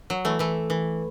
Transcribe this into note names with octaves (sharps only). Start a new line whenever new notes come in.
F#3
E3 A3
E3 A3
E3